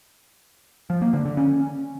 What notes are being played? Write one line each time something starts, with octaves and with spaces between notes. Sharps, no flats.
F3
A#3
D3
D3
C#4